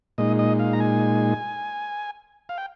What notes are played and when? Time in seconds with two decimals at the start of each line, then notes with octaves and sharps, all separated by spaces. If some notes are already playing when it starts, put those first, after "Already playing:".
0.18 A#2 G#3 D#4 D#5
0.39 D#5
0.59 F5
0.73 A#5
0.80 G#5
2.49 F5
2.58 G5